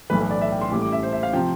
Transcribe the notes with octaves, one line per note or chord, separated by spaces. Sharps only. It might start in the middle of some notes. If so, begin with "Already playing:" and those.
B1 A2 E3 B4
B4
D5
E5
G5
C6
A1 A2 G3 D6
D6
E5
C5
E5
F5
C3 F3 G5